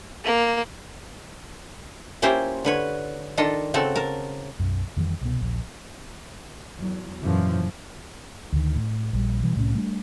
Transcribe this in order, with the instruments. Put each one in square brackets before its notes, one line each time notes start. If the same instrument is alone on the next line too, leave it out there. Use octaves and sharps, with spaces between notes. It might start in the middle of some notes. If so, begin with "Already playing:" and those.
[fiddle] A#3
[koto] A#3 C#4 E4 F4 G4 C5
D3 B4 C#5
D#3 D4 F4 A4 D#5
C#3 C4 F#4 A4
A#4 A5
[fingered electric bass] B1 F#2
F2 D#3 E3 G3
C2 B2
D#1 A#1
[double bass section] E2 F#3
F#2 A#2 C#3 E3 F3
[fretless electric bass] D2 D#3
A2
A#1 G3
B2 E3 G3
C2 A2 C3 C#4
G3 A3 D4